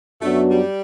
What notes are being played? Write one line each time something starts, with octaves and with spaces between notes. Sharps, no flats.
F#2 F#3 A3 B3 D4 F#4
G3